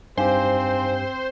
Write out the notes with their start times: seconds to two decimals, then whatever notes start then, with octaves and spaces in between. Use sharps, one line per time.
0.17 G2 C4 D#4 G4 C5 F5 G#5